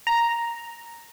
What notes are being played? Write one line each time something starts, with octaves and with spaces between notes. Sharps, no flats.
A#5